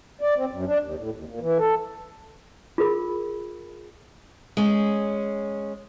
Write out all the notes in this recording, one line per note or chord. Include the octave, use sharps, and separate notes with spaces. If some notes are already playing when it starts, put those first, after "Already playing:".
D5
C4
F#2
D4
D#2
A2
D#2
A#2
E3
A4
F4 G#4 A#4 B5
G#3 C#4